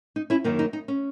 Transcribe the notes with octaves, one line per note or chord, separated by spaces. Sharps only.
D#4
C#4 E4
F#2 D#3 A#3 D#4
D#4
D#4
C#4